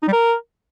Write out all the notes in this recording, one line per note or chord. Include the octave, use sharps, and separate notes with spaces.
D#4
G3
A#4